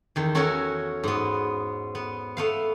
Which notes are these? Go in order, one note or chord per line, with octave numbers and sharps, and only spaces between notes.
E2 D#3
C#4 F#4 A4 A#4 F#5 G#5
G#2 B3
B3
A3 B3 F5